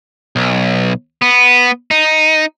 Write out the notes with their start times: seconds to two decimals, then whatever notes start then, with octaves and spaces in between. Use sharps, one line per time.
0.36 B1
1.22 B3
1.91 D#4